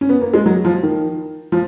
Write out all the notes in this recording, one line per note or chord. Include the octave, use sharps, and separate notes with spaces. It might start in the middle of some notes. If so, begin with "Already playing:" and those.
C#4
B3
A#3
G#3
F#3
F3
D#3
F3